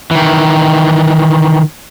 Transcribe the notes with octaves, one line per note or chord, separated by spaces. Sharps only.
D#3 E3